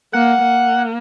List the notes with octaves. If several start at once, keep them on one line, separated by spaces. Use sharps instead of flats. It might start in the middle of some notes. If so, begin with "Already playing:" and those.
A#3 F#5
A#3